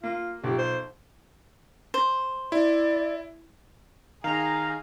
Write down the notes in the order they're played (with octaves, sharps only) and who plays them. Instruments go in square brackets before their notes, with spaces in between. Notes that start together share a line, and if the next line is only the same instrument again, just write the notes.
[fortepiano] A#3 [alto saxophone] F4
[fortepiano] B1 F3 [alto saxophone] G4
[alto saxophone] C5
[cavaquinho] C5
[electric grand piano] E4 [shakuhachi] D5
[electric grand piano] D#3 D#4 [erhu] G#4 [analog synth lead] F5 [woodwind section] A#5